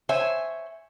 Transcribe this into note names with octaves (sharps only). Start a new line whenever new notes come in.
C5 C#5 E5 G#5